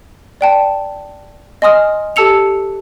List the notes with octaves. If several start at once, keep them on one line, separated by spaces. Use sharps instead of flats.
D5 G5 A5
D#5 G#5 C6 D#6 F6
G4 A4 A5 E6 C#7 F7